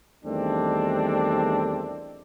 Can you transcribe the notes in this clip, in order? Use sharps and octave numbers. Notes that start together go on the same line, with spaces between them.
E2 D#3 G3 A3 C4 D4